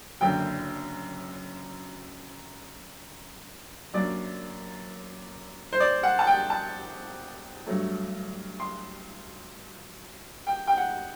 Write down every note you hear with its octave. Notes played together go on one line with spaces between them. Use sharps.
F#1 F#2 D3 G5
F#2 F#3 A#3 D4 D5
C5
D5
F#5
A5
G5
A5
G2 F#3 A3
C6
G5
G5
F#5